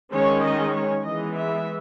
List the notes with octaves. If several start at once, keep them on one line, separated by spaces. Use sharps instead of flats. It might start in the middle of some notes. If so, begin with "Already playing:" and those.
D#3 G#3 C#4 C#5
D#5
C#5
E3 G#3 B3 D#5
E5